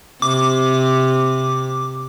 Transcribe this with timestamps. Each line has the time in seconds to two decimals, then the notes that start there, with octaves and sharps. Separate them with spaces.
0.22 C3 D6